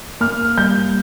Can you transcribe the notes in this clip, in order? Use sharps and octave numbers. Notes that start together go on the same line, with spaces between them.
A#3 F6
G3 G6